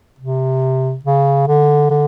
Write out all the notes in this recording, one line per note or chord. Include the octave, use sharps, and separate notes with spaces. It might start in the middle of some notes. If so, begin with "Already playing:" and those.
C3
C#3
D3
D3